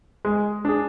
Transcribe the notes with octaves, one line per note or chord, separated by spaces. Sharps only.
G#3
D4 G#4